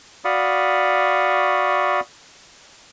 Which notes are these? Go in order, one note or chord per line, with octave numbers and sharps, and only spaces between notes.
F#4 D5 F5 B5 C#6 D#6